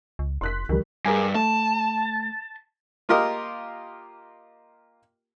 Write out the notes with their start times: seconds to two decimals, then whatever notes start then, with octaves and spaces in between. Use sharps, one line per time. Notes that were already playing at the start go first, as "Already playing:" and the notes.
0.19 C#2
0.41 F1 C6 F#6 B6
0.69 C#2 D#3 G3
1.05 G2 G#4 A#4 G#5
1.35 A3 A5
3.09 A#3 F4 G4 A#4 D#5